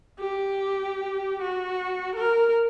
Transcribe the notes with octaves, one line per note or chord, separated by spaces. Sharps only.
G4
F#4
A#4